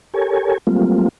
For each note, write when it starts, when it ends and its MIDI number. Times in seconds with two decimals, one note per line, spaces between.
0.14 0.58 67
0.14 0.58 69
0.14 0.58 70
0.14 0.58 73
0.14 0.58 80
0.67 1.08 54
0.67 1.08 55
0.67 1.08 57
0.67 1.08 58
0.67 1.08 60
0.67 1.08 65